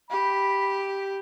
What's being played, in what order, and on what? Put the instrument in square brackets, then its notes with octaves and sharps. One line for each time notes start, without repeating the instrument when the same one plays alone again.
[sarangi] G4 [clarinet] B5